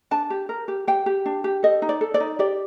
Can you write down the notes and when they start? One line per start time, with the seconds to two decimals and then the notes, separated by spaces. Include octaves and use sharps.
0.11 D4 A5
0.30 G4
0.49 A#4
0.68 G4
0.87 G4 G5
1.06 G4
1.26 D4
1.44 G4
1.63 A4 D#5
1.82 D#4
1.89 D5
2.01 A4
2.14 D5
2.20 D#4
2.39 G4 D5